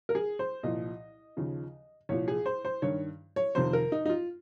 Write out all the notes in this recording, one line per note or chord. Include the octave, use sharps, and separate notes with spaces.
A#4
G#4
C5
C2 A#2 F3 D#5
D#2 C#3 F3
C2 A#2 F3 C#5
G#4
C5
C5
G2 D#3 C#5
C#5
F2 C3 D#3 C5
A#4
D#4
D#4
F4